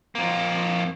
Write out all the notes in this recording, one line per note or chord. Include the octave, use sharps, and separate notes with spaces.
F2 A#3